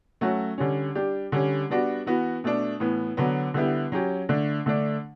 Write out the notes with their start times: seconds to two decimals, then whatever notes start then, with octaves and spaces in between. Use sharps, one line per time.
0.21 F#3 A3 C#4 F#4
0.58 D3 G3 C#4
0.95 G3 D4 G4
1.32 D3 G3 C#4
1.70 G3 B3 D4 F#4
2.06 E3 B3 F#4
2.44 B2 A3 D4
2.80 A2 E3 B3
3.17 D3 F#3 B3
3.54 D3 G3 B3 E4 G4
3.92 F#3 C#4 G4
4.29 D3 A3 D4
4.66 D3 A3 D4